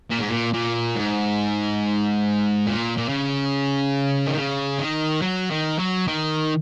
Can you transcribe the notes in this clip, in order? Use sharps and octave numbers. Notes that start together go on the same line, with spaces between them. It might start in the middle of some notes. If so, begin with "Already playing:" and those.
A#2
G#2
A#2
A#2
G#2
A#2
A#2
C#3
D#3
C#3
D#3
F#3
D#3
F#3
D#3